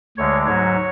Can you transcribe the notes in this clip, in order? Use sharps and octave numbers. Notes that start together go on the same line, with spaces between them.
D2 D3 G#3 C#5
G#2 F#3 C#5